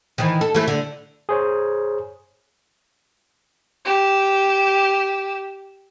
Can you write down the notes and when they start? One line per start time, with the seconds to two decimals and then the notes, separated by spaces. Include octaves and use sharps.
0.18 D#3 E3
0.41 A4
0.55 E3 A3
0.68 D3
1.29 G#4 C5 C#5
3.85 G4 E7